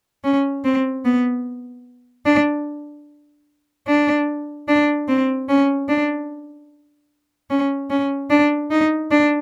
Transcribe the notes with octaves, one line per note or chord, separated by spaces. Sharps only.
C#4
C4
B3
D4
D4
D4
C4
C#4
D4
C#4
C#4
D4
D#4
D4